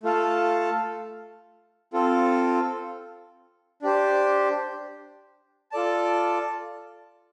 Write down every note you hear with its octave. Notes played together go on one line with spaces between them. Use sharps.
A3 F4 A4 F5 A5
C4 F4 A4
D4 G4 C5
F4 A4 D5 A5